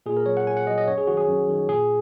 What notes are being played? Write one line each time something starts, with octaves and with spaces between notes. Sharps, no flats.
A#2 G#4
A#4
F#3 C#5
F#5
A#2 G#5
F#5
F#3 D#5
D#5
F#2 C#5
G#4
D#3 F#3 F#4
G#4
F#2
D#3 F#3
A#2 G#4